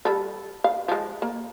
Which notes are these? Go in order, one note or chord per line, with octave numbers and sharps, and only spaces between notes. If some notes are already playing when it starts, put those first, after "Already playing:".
G3 A4
F5
F3 G#3
A#3